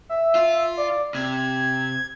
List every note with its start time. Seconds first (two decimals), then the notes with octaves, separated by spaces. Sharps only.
0.09 E5
0.35 F4
0.77 D5
1.15 C3 G#6